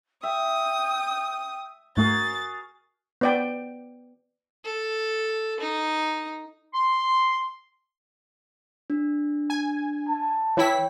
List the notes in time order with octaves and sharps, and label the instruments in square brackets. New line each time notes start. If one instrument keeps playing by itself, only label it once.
[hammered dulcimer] E5 [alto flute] G5 [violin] D#6
[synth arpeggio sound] G#2 A3 A#3 [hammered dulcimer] F#4 G#4 A#4 [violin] A6
[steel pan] B3 D5 G5
[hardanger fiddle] A4
D#4
[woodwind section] C6
[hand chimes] D4
[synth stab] G#5
[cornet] A5
[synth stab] E3 E4 B6 [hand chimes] C#5 G5